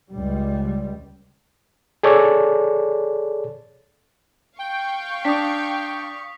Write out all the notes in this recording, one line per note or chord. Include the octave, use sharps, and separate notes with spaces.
C#2 G3
G#4 A4 C#5 D5
F5 G5 C#6
D4 D#6 B6